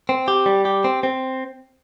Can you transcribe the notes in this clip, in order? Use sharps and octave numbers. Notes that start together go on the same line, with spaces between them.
C4
G4
G3
G4
C4
C4